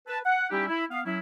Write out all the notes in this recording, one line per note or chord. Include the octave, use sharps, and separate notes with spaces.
B4 A5
F#5
G3 C#4 D#4 E4 G4
E4
B3 F5
F#3 C#4 E4